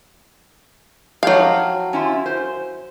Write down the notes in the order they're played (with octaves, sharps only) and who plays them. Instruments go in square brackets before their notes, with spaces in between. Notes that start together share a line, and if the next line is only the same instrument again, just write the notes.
[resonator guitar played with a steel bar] F3 G4 C#5 [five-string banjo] F#3 F5
[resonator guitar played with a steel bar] C#4 E4 F4
C5